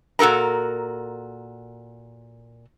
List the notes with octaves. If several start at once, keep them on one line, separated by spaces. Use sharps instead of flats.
A#2 F#4 A4 A#4 A#5